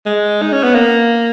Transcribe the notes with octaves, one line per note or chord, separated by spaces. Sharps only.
G#3
D#4
C#4
B3
A#3